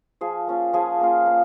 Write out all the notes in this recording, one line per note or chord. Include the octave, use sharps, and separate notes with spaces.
F3 G#4
A#3 C#4 F4
F3 G#4
A#3 C#4 F4
A#3